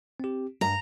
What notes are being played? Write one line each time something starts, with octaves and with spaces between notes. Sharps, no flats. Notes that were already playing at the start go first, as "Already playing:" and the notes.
C4 G4
G2 A#5